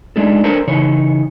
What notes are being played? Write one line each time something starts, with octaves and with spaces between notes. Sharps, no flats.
G#3 A3 D4 D#4 A4
D4 A4 A#4 C5 C#5
C#3 E3 D#4 C#5